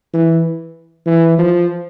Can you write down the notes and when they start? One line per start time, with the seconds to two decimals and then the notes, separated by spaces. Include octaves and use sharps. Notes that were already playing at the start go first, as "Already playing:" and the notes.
0.14 E3
1.06 E3
1.38 F3